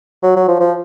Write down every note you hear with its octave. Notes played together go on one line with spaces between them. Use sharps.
F#3
F#3
F3
F3